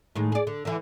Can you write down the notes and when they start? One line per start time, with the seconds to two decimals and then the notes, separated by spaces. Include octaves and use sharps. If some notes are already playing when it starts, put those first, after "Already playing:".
0.15 A2 D#3 G#3
0.32 G#4 D5
0.47 D3
0.65 D3 E3